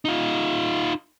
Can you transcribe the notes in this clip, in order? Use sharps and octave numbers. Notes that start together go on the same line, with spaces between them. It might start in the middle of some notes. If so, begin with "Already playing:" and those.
D#4 F4